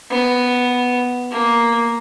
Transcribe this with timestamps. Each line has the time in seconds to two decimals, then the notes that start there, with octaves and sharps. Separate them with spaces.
0.10 B3
1.31 A#3